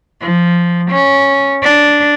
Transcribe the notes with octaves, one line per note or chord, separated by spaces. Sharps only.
F3
C#4
D4